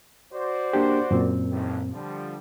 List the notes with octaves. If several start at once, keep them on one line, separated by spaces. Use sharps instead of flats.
F#4 C5 D5
A#3 D4 G4
F#2 A#2 C4
A1 D#2
D3 F3 G3